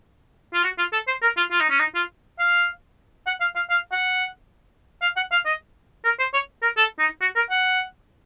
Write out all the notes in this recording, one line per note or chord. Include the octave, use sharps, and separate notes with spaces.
F4
F#4
F4
A4
C5
A#4
F4
F4
D#4
C#4
D#4
F4
F5
F#5
F5
F5
F5
F#5
F5
F#5
F5
D#5
A#4
C5
C#5
A#4
A4
D#4
F#4
A#4
F#5